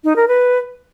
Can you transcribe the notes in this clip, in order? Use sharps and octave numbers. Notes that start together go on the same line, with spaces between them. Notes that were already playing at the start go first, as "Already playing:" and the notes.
D#4
A#4
B4